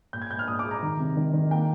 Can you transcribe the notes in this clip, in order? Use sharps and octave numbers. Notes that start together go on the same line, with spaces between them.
A#2 G6
G#6
A#2 G6
F6
A#2 D#6
D6
G#3
A#5
D#3
C3
D#3
D#3
A#3 G5